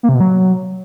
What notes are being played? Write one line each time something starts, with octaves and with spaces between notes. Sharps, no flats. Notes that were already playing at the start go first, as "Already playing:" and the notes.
A#3
C3
B2
F#3